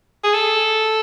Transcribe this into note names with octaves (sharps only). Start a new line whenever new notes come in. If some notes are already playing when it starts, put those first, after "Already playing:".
G#4
A4